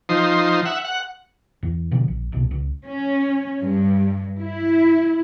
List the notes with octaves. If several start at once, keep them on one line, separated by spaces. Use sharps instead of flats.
F3 D#4 C5
E5 F#5
F#5
E2
B2 D3 F3
A#1
D#1 C2 B2
C#2
C#4
G2
E4